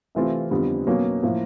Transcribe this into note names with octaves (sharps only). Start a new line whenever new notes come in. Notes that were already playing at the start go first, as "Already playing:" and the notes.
C3 E3 A3 C4 F4
F2 D3 G3 B3
B2 F#3 A#3 C#4
A2 F3 A#3